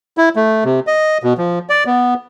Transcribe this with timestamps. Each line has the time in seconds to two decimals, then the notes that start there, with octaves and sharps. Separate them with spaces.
0.18 E4
0.36 A3
0.64 C3
0.87 D#5
1.23 B2
1.38 F3
1.69 D5
1.86 B3